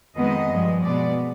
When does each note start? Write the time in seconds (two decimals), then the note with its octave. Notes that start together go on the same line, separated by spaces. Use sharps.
0.18 F2 D#3 G#3 B3 D#5
0.52 G2 F3 G#3
0.85 B2 G#3 B3 D5